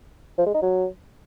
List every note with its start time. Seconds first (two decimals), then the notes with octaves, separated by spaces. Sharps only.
0.38 F3
0.46 G#3
0.54 D#4
0.62 F#3